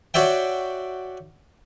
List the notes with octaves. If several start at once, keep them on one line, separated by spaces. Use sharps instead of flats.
F#4 C#5 D5 E5 G5